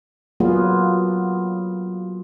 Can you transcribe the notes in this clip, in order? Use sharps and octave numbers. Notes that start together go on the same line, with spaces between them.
F#3 A#3 B3 F4 G#4